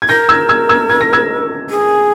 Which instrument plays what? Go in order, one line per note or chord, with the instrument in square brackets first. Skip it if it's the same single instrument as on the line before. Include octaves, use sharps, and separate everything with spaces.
[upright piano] G#6
[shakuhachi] A#4 [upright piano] G6 A#6
[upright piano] E6 G#6
E6 G#6
E6 G#6
G#6
A#6
E6 G#6
[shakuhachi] G#4